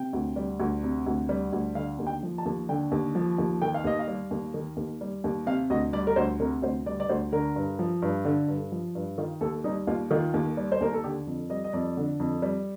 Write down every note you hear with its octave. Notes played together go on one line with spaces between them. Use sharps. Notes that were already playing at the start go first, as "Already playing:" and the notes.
Already playing: C3 G5
D2
G3
D2
C3
D2
G3
D2
D3 F5
D#2
G5
F3
A5
D#2
D3 G5
D#2
F3
D#2
D#3 G5
F5
D#2 D#5
F5
G3
D#2
D#3
D#2
G3
D#2
C3 F5
D2 D#5
G3 D5
A#4
D2 C5
C3 A#4
D2 C5
G3 D5
D5
D2 C5
D3 A#4
G2
F3
G2
D3
G2
F3
G2
D#3 F4
D#2 A4
G3 D#4
D#2 F4
D#3 F4
D#2
G3
C5
D#2 A#4
A4
D3 G4
F2
G3 D#5
D#5
F2 D5
D3
F2
G3